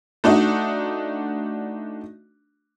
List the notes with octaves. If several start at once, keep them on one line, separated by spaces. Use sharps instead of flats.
A3 D4 D#4 F#4